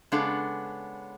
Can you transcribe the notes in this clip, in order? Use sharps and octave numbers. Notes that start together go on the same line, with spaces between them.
C#3 G#3 B3 D4 A4